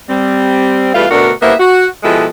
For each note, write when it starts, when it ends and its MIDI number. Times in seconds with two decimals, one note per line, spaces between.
0.10 0.90 55
0.10 0.90 60
0.94 1.06 40
0.94 1.06 55
0.94 1.06 57
0.94 1.06 65
0.94 1.06 71
0.94 1.06 77
1.11 1.31 38
1.11 1.31 47
1.11 1.31 62
1.11 1.31 66
1.11 1.31 70
1.42 1.54 55
1.42 1.54 58
1.42 1.54 59
1.42 1.54 64
1.42 1.54 72
1.42 1.54 76
1.60 1.86 66
2.03 2.26 47
2.03 2.26 53
2.03 2.26 56
2.03 2.26 64
2.03 2.26 67
2.03 2.26 69